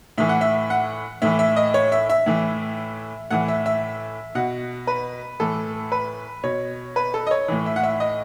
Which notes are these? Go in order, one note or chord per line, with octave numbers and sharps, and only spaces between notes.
A2 E3 E5
F#5
E5
F#5
A2 E3 E5
E5
D#5
C#5
E5
E5
A2 E3
A2 E3 F#5
E5
E5
B2 F#5
B4
A2 E3 A4
B4
B2 C#5
B4
A4
D#5
C#5
A2 E3
E5
F#5
E5
D#5